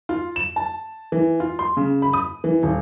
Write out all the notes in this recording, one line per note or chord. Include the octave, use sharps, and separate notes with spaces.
F4
E7
A5
E3
F4
C6
C#3
B5
D#6
E3
D#1